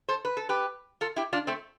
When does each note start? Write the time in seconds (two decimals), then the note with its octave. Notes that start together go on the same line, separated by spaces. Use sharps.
0.09 A4 C5
0.25 B4
0.37 A4
0.49 G4 B4
1.01 F4 A4
1.16 E4 G4
1.33 D4 F4
1.47 A3 C4